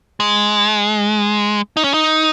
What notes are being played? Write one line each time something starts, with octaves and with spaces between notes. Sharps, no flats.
G#3
D#4
C#4
D#4